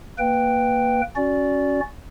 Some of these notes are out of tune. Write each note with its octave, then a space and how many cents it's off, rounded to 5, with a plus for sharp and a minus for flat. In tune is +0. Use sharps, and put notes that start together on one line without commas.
A#3 +0 B4 +0 G5 +0
C#4 +0 F#4 +0 D5 -15